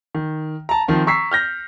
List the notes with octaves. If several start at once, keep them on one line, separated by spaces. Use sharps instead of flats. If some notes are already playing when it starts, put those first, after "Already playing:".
D#3
A5 A#5
D#3 F3 C4
A#5 C#6 E6 B6 C7
F6 G6 A#6